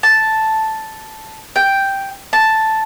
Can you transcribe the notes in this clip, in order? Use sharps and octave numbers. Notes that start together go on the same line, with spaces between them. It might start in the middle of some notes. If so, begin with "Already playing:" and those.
A5
G5
A5